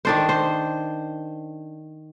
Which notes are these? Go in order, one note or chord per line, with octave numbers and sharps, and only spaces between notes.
D#3 D4 C5
C5